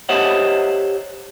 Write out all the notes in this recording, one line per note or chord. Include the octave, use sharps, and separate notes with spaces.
G4 C5 C#5 D#5 E5 F#5